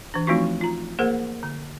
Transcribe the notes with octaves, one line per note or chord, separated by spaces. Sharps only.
E3 D4
F3 A3 C4 D#4 F4 F#4
F4 A#5
A#3 G#4 A#4 C5 F#5
D3